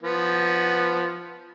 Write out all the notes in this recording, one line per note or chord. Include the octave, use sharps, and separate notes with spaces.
F3 B3